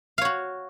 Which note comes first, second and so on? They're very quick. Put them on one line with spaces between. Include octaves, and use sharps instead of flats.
F5 C#5 F#4